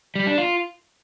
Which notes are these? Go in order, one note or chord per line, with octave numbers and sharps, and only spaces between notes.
G3
D4
F4